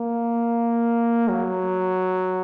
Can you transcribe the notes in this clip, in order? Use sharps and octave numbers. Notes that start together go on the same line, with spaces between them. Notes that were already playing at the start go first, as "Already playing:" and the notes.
Already playing: A#3
F#3